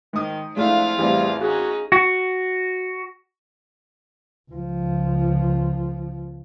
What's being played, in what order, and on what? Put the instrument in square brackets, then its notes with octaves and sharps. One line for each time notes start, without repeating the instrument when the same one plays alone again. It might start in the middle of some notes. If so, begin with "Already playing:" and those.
[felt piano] G#2 D#6 [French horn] D#3
[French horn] F2 [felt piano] G#3 A3 E4 [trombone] D4 [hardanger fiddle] F4 F5
[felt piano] A1 C4 [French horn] E2 [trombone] G3
[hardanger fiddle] C#4 D#4 [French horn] F#4 [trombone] G#4
[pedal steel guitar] F#4
[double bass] C#2 F3